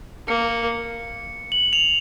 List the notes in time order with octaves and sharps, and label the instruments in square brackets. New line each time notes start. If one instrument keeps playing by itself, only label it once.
[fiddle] A#3 [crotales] C#7
[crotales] F#7
F7